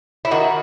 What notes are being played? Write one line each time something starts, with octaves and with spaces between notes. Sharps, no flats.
E4
D#3 F#4